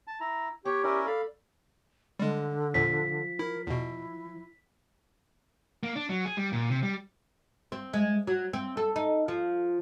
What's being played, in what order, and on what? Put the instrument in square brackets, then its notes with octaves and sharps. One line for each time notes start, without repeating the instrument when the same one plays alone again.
[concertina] A5
[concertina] E4 [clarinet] A#5
[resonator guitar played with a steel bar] B3 [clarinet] G4 [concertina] C#5 G5
[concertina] C#4 E4 A#4 [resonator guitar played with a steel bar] D5
[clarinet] A4 [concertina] F5 B5
[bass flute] D3 [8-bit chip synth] G3 G#3
[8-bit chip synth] E2 A#2 [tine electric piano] F3 [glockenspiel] B6
[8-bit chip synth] E4 [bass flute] A#4
[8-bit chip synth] E2 B2 [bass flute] E4
[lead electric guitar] A#3
D4
F#3
G#4
G3
A#2
C3
G3
[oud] C4
G#3
F#3
C4
A4
D#4
F3